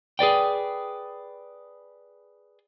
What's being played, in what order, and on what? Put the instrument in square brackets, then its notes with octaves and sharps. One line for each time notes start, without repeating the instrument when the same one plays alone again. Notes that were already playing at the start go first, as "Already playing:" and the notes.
[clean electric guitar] G#4 B4 D5 G5